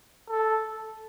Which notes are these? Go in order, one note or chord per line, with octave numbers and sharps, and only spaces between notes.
A4